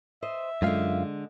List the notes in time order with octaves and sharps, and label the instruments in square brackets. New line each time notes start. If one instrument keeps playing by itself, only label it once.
[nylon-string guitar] C5 D#5 [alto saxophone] E5
[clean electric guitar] F#2 F4 F5 [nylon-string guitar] D3 G#3